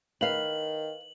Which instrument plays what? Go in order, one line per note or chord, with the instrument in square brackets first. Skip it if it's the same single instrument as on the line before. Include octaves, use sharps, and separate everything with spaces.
[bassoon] D#3 [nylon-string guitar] B4 F5 [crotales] F#7